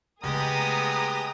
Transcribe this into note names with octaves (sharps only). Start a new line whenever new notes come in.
C#3 G#3 A3 B3 G4 G#4 A#5 D#6